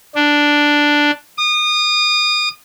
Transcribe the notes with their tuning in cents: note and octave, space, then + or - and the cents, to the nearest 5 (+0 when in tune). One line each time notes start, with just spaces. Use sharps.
D4 +0
D#6 -30